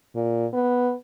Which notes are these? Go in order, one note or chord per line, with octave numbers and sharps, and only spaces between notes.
A#2
B3